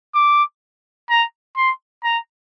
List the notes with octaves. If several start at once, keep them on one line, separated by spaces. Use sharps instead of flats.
D6
A#5
C6
A#5